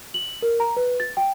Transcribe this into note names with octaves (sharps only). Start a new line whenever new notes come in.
F#7
A#4
A#5
B4
A6
G5